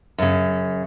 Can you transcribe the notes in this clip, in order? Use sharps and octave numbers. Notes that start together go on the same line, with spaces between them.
F#2 C#3